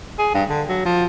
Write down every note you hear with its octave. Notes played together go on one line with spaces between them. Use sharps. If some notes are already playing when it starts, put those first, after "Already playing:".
G#4
G2
D3
F#3
F3